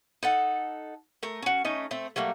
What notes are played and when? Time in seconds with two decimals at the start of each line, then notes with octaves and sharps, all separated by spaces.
0.23 D#4 A4 F#5
1.23 A3 A#4
1.43 C#4 F#4
1.65 A3 C#4 D#4
1.91 A3 C4
2.16 F#3 G3 A3 A#3